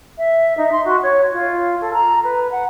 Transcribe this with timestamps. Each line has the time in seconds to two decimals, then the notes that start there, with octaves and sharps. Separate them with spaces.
0.18 E5
0.57 D#4
0.72 C6
0.85 F#4
1.03 C#5
1.32 F4
1.81 A4
1.94 A#5
2.24 B4
2.51 F#5